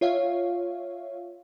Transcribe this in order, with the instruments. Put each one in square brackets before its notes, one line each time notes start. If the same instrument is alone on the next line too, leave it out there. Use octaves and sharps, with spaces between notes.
[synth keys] F4 C#5 E5 F5